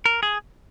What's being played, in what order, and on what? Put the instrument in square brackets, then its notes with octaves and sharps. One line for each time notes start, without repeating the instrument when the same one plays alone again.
[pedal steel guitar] A#4
G#4